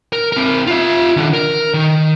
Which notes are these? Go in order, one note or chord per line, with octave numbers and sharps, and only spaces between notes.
A#4
C4 A#4
F4 E5
D#3 D4
A#4
D#3